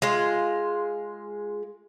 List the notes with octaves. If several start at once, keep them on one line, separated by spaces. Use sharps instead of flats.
G#3 F4